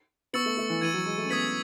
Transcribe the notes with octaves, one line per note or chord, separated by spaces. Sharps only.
B3 C#6 E6 A6 C#7 F#7
A3
A3
E3
E3 G#6 D#7 F#7
F#3
G#3
A3
C#4
B3 D#6 G#6 B6 F#7